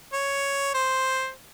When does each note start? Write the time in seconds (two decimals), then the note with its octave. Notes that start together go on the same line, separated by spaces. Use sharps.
0.13 C#5
0.74 C5